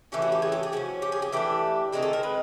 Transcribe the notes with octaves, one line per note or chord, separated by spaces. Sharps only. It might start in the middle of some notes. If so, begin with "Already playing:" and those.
A2 E3 A3 C#4 G4
F#4
G4
G#4
G4
G#4
F3 A#3 C#4 F#4
G4
G#4
G4
E3 A3 D4 G4
D#3 G#3 C4 D#4 G#4
A4
A#4
B4